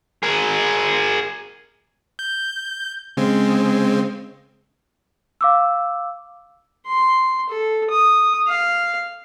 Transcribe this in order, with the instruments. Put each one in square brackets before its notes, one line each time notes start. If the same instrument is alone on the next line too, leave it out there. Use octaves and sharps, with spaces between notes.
[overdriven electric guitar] G#4 A#4
[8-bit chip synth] G6
C#3 G#3 C4
[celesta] F5 D6 E6
[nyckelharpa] C6
A4
D#6
F5